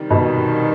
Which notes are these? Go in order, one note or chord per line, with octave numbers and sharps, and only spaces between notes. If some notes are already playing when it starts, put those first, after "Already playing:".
Already playing: C3 D#3 G3
B2